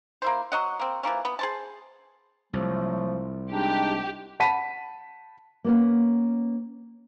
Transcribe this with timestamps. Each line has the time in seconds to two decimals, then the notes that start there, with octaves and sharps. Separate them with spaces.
0.22 A#3 E4 C5
0.52 F#3 D#5 F#5
0.79 A#3 C4
1.03 E3 F3 A#3 C#4
1.25 B3
1.39 G#4 C5 A5
2.53 C2 F3 F#3 A3
3.52 G#3 D4 D#4 G4
4.40 F#5 A5 B5 B6 D#7
5.64 A#3 B3 C#4